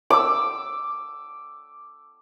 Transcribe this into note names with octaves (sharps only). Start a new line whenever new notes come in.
D6 E6